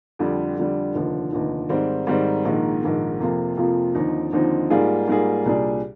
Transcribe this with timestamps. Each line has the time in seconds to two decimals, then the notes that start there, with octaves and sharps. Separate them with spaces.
0.19 F2 D3 G3
0.57 F2 D3 G3
0.94 F1 D#2 D3 F3
1.32 F1 D#2 D3 F3
1.69 G#2 D#3 G3 C4
2.07 G#2 D#3 G3 C4
2.45 A#1 G#2 D#3 A#3
2.83 A#1 G#2 D#3 A#3
3.20 F2 C3 F3 A#3 F4
3.57 F2 C3 F3 A#3 F4
3.95 D#2 D3 F3 C4 D#4
4.32 D#2 D3 F3 C4 D#4
4.70 G#2 G3 A#3 F4 G#4
5.08 G#2 G3 A#3 F4 G#4
5.45 C2 A#2 G3 D4 G#4